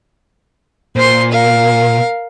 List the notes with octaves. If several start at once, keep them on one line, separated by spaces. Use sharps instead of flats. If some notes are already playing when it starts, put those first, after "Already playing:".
A#2 C5 C6
A#4 F5